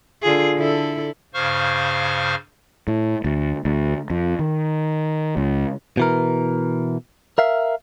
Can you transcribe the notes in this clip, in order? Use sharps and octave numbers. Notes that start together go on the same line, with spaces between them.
D3 F4 G#4
D3 E4 A4
G2 C#3 C5 F5 C#6 F6
A2
D2
D2
F2
D#3
C#2
B2 E3 A#4
A#4 E5 F5